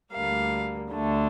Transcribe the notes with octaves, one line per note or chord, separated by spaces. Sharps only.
D2 D3 G3 A#3 F5
D2 D3 A3